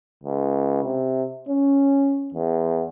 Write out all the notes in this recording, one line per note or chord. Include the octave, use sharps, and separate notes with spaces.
C#2
C3
C#4
E2